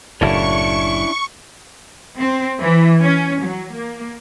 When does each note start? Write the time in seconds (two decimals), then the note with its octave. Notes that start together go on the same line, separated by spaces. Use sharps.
0.21 F#1 A2 C#4 D4 E4 C#6
2.18 C4
2.59 E3
3.02 C#4
3.43 F#3
3.72 A#3